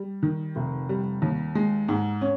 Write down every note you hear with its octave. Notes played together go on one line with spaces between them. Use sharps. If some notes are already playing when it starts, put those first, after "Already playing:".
Already playing: G3
D#3
F1
G3
D#2
G#3
G#2
C#4